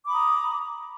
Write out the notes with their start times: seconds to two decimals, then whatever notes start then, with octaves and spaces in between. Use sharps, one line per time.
0.05 D6
0.08 B5
0.11 D#6
0.14 A#5